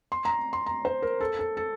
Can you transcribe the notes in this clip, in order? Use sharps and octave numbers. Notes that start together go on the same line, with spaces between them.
C6
A#5
C6
A#5
C5
A#4
A4
A4
A4